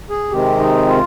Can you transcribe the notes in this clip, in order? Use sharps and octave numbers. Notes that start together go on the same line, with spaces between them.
G#4
C3 D#3 G#3 C4 G4
D#4
F4